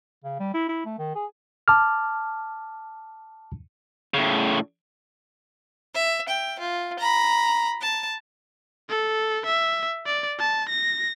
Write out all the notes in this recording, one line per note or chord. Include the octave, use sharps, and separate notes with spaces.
C#3
G3
E4
E4
A3
D#3
G#4
A5 D6 F6
A2 C#3
E5
G5
F4
A#5 B5
A5
A4
E5
D5
A5
A#6